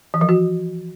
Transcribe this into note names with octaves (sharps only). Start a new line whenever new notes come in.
E3
F3
F#4